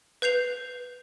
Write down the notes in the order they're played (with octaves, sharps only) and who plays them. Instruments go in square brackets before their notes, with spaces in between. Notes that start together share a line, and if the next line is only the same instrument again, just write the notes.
[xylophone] B4 G6 C7 F7